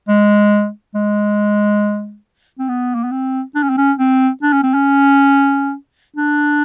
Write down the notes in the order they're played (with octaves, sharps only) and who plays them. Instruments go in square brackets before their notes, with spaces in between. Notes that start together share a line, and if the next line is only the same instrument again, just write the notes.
[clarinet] G#3
G#3
C4
B3
A#3
B3
C4
D4
C#4
C4
C#4
C4
D4
C#4
C4
C#4
D4